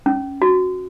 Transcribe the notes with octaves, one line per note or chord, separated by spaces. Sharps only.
C#4
F#4